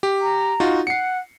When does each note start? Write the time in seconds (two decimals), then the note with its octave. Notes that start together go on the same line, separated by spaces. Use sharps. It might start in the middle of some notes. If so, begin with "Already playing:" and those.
0.03 G4
0.22 A#5
0.60 D#4 F4 F#4
0.87 F#5 C7 C#7